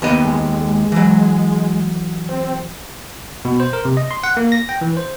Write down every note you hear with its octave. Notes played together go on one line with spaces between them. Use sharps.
D#2 B3 D#5
G#3
G#3
E3 F#3
C4
B2
C5
A#4
C3
D#5
C6
F#5
A#3
A#6
G5
E3
C5